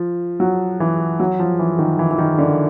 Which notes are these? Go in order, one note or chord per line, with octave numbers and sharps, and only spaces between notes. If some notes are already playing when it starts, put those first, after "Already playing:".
Already playing: F3
F#3
E3
F#3
F3
E3
D#3
E3
E3
D#3
D3